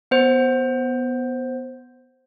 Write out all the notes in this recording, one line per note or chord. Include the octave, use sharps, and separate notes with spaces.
B3 C5